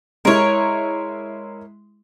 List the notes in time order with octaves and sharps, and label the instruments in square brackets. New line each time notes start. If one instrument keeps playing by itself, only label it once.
[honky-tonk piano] G#3 E4 [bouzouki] A#4 C#5